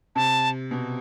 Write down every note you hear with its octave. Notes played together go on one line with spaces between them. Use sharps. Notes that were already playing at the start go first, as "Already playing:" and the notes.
C3 A5
B2